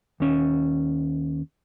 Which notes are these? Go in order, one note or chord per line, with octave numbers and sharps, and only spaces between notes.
D#2 C#4